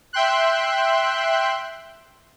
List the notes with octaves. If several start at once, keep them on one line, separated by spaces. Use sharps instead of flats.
E5 G5 C6 F#6